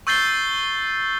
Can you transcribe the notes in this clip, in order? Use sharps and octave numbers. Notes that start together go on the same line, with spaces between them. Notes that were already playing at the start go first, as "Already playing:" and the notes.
C#6 E6 G6 A6 C7 G7